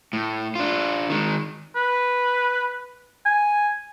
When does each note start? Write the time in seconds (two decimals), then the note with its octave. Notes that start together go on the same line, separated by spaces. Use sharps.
0.13 A2
0.56 D4 F4
1.10 D#3 G#3
1.76 B4
3.26 G#5